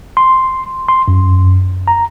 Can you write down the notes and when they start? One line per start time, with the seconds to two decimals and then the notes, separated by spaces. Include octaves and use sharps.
0.17 C6
0.88 C6
1.08 F#2
1.88 A#5